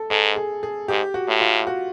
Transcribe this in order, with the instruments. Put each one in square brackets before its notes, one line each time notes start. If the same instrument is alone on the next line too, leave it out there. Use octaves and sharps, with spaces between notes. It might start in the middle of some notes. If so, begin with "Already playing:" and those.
Already playing: [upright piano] A4
[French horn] G#2 [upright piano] A4
[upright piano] G#4
G#4
[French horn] G#2 [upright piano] G4
[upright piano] F#4
[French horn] A2
[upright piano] F4
F#4